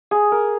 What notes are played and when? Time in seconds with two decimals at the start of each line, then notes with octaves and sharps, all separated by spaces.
0.11 G#4
0.32 A#4